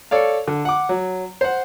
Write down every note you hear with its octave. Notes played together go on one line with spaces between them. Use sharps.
A4 C#5 D5 F5
D3
F#5 D6
F#3
C5 F#5